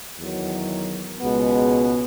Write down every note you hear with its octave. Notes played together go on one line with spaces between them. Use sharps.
E2 D#3 F#3
C#2 B2 G#3 B3